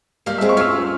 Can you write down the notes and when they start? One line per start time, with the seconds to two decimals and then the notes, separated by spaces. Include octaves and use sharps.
0.26 G3 A#3 F5
0.38 G#3 C4 E5
0.49 C#6
0.57 C#4 F4 E6 F6
0.71 E6